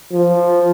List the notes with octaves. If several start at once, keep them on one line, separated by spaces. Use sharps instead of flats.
F3